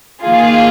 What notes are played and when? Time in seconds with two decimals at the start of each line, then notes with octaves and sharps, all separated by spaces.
0.23 D#3 A#3 F4 G#4 F5
0.53 F5